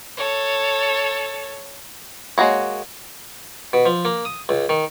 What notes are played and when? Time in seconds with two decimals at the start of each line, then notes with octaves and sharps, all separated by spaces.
0.17 A4 C#5
2.38 G#3 A#3 F#4 C#5
3.73 B2
3.86 F3
4.05 A#3
4.25 D#6
4.49 C#2
4.69 D#3